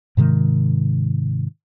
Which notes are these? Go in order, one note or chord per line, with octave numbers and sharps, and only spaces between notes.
G#2 C3 D#3 G#3